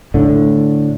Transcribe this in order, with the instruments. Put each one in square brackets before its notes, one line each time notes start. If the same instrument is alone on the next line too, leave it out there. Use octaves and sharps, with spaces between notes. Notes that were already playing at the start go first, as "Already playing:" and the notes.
[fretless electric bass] A2 D3